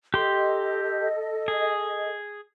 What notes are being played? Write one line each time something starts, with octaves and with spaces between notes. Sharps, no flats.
G4 A4 D#5 C6
G#4